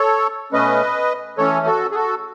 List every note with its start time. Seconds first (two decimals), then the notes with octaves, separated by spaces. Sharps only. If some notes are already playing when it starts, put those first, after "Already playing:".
Already playing: A4 C#5
0.52 B2 A3 C#4 B4 D#5
1.38 E3 A3 C#4 A4 C#5
1.66 F#4 A4
1.91 G#4
1.95 F#4 A4